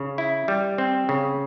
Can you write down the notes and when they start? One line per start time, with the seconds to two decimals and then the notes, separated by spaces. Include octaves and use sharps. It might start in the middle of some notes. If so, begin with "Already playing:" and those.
Already playing: C#3
0.18 E4
0.48 G3
0.78 C4
1.09 C#3